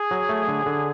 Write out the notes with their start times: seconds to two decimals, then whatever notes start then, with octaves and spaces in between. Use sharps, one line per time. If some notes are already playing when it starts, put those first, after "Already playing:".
Already playing: G#4
0.11 F#3
0.29 A3
0.48 D3
0.66 D3